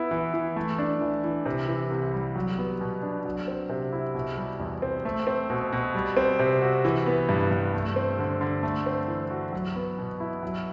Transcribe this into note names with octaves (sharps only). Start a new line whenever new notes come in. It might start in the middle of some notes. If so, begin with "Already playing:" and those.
Already playing: B3 E4
E3
E3
A3
D4
E3
E3
C3
E3
C2
G3
F#3
B3
B2
D4
F#3
C4
C3
E4
B2
G3
E2
C4
A3
C4
B2
B2
G3
C4
C3
F#4
E3
B3
G2
G2
A3
C4
D3
D3
A3
C4
E3
F#4
F#3
B3
B2
E4
F#3